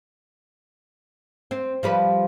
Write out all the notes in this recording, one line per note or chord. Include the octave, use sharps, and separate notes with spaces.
C4
F3 G3 B4